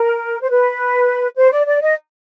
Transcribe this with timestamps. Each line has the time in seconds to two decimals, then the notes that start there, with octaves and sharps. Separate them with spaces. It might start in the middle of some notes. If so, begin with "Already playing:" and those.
Already playing: A#4
0.41 C5
0.50 B4
1.37 C5
1.52 D5
1.67 D5
1.81 D#5